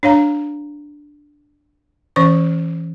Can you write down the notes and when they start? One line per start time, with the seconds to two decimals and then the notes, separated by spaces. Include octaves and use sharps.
0.03 D4 C#5 F5 A#5
2.16 E3 C#4 C5 C#6